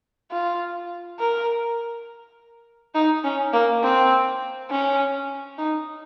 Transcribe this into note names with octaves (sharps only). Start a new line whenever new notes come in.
F4
A#4
D#4
C#4
A#3
C4
C#4
D#4